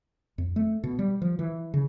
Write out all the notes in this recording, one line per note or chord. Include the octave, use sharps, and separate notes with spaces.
F2
A3
B2
G3
F3
E3
C#3